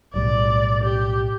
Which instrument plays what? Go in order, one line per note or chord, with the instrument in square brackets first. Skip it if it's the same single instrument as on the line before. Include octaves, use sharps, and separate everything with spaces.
[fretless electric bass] B1 A2 G3 [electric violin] D5
[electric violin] G4